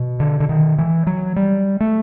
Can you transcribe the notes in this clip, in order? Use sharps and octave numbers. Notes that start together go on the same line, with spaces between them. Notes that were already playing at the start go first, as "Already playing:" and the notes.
Already playing: B2
D3
D3
D#3
E3
F#3
G3
A3